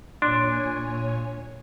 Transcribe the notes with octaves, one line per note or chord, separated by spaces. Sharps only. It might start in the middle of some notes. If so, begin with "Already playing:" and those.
A#2 D4 C#5 G#5 C6